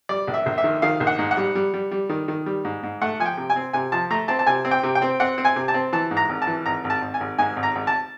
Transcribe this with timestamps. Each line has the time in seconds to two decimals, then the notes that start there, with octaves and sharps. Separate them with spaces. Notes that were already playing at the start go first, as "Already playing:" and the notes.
0.09 G3 D5
0.27 A#1
0.34 E5
0.46 A#1
0.58 E5
0.64 D#3
0.82 D#3 F5
1.00 A#1
1.07 F#5
1.19 G#2
1.31 F#5
1.37 G3
1.55 G3
1.74 G3
1.91 G3
2.09 D#3
2.28 D#3
2.46 G3
2.65 G#2
2.83 G#2
3.02 A3 F#5
3.20 F3 G#5
3.26 G5
3.37 C3
3.50 G#5
3.56 C4
3.73 C3 G#5
3.92 F3 A5
4.11 A3 A#5
4.28 C4 A5
4.39 A5
4.46 C3 G#5
4.65 C4
4.71 G5
4.83 C3
4.95 G5
5.02 C4
5.20 C4 F#5
5.38 C4
5.45 G#5
5.56 C3
5.68 A5
5.74 C4
5.93 E3 A5
6.11 G#2
6.17 A#5
6.29 G#1
6.42 A5
6.47 E3
6.66 G#1 A#5
6.84 G#1
6.90 A5
7.02 G#1
7.14 G#5
7.20 G#1
7.38 G#2 G#5
7.56 G#1
7.63 A#5
7.75 G#1
7.87 A5